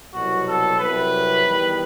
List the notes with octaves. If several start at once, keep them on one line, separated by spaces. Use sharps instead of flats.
C2 B2 F#3 F#4
A4
C2 C3 F#3 B4
E2 D#3 G3